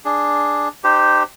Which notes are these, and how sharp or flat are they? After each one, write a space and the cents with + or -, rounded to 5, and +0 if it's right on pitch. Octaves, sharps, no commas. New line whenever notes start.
D4 +0 G#4 +0
D#4 -40 G4 -5 C5 -5